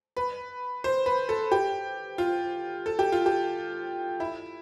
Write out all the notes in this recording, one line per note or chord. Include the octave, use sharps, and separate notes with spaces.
B4
C5
B4
A4
G4
F4
A4
G4
F4
G4
E4